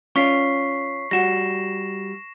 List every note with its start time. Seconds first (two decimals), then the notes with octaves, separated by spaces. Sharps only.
0.16 C#4 F4 D5 C#6 B6 C7
1.11 G3 F#4 A#6 E7